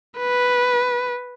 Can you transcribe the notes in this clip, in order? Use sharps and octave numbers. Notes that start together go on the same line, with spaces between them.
B4